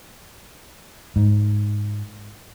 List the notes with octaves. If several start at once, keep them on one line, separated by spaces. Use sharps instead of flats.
G#2